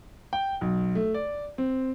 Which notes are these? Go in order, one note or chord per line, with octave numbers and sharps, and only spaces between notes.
G5
B1
A3
D5
C4